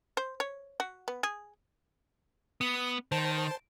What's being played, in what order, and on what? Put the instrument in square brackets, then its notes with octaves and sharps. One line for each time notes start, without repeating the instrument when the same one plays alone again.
[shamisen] C5
C#5
F#4
B3
G#4
[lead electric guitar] B3 [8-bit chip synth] D#6
[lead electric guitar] D#3 [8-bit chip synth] C5 A5